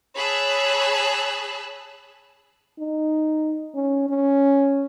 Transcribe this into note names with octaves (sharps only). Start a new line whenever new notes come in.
G#4 C#5 A5 B5 E6 F#6
D#4
C#4
C#4